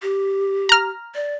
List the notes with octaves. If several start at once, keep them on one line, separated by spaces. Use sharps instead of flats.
G4
A#5 F6
D5